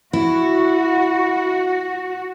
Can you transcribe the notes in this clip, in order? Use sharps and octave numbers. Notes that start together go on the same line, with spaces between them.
E4 F#4